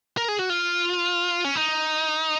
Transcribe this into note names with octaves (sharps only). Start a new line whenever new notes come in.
A#4
G#4
F#4
F4
C#4
D#4